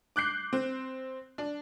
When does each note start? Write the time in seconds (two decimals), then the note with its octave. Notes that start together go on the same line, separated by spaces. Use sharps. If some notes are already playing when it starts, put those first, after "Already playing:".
0.16 D6 F#6 G6 C7
0.53 C4
1.38 D4